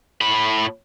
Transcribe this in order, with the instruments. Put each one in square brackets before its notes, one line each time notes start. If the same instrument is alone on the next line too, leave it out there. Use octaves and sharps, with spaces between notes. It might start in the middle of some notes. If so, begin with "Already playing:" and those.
[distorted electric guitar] A2 B5